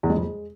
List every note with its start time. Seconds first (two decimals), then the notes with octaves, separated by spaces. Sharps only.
0.03 E2
0.10 G#3
0.16 F2
0.22 G#3